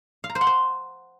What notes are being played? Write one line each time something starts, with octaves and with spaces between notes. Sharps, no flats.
F5
A#5
C5
F#5
C5